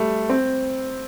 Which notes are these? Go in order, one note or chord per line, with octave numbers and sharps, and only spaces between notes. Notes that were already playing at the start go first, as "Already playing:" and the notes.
Already playing: G3 A3
C4